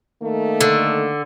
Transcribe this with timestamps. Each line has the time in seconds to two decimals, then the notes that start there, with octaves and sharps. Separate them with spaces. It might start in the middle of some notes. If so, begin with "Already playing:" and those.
0.22 D#3 A3 A#3
0.61 D3